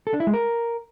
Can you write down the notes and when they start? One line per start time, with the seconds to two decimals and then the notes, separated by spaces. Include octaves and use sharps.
0.07 A4
0.13 D4
0.20 E4
0.27 G#3
0.34 A#4